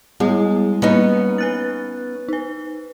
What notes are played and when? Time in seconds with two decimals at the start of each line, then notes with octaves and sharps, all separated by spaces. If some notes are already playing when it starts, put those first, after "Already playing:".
0.20 G3 G#3 B3 E4
0.82 G3 A#3 B3 C#4 D#4
1.38 B4 F#6 A6
2.28 D#4 B4